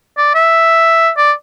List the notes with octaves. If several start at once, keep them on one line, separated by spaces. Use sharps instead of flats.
D5
E5
D5